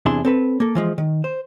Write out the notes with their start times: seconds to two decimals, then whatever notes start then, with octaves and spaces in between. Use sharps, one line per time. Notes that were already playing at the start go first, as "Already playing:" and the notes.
0.06 E2 C3 D4 E4 G#4 C6
0.25 C4 A4 B4
0.60 A#3 A4
0.75 E3 F3 G#3
0.98 D#3
1.24 C5